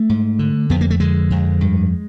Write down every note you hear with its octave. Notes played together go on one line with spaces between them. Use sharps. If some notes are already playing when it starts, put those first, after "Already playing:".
Already playing: A3
G#2
D3
F2 B3
A#3
A3
D3 G#3
F2
G2